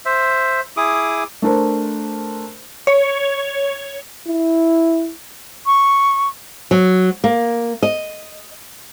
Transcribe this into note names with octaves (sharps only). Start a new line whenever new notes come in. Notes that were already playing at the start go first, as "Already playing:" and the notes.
C5 E5
E4 G#4 D6 D#6
A3 D4 A#4 C5
C#5
E4
C#6
F#3
A#3
D#5